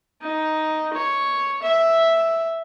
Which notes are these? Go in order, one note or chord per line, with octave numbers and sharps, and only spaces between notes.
D#4
C#5
E5